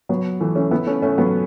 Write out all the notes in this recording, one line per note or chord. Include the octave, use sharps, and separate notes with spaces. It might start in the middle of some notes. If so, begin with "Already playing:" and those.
F#3 B3
E3 A3
A3 C#4
B3 E4
A3 C#4
A3 C#4
F#3 B3